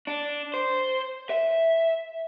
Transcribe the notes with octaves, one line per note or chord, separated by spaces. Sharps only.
D4
C5
E5